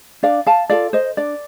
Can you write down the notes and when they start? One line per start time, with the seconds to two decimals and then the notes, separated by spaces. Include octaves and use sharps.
0.23 D4 D5 F5
0.46 F5 A5
0.70 F4 A4 D5 F5
0.93 C5 D#5
1.17 D4 D5